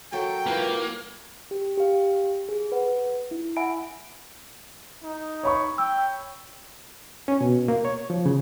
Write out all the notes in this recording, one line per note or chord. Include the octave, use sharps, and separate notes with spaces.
F#3 A4 A#4 G5
A#3 E4 F4 B4
G4
G4 F5
G#4
B4 F#5
E4
E5 F#5 G#5 B5 D7
D#4
C#5 B5 C#6
G5 E6
C#4
B2
A#3
C#5
F3
C#3